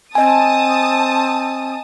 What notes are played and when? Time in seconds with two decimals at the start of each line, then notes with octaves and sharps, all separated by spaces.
0.15 C4 D#5 G#5 A5 D#6